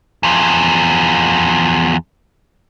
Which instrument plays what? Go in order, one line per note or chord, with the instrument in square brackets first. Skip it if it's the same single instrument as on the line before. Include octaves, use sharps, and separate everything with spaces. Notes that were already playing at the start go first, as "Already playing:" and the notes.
[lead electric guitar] E2 F3